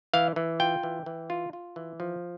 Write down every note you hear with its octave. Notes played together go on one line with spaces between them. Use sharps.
E3 F5
E3
F4 G5
E3
E3
F4
F4
E3
F3